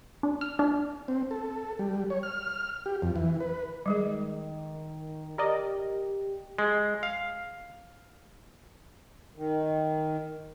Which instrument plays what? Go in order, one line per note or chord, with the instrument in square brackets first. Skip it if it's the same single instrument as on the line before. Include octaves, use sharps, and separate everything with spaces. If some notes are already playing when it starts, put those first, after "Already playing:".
[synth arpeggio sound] D4
F6
D4
[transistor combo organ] C4
A4
G3
C#5
F6
G4
F2
E3
B4
[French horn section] D#3 [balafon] G3 G#3 G#4
[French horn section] G4 [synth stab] A#4 D5 D#5
[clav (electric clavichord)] G#3
F5
[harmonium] D#3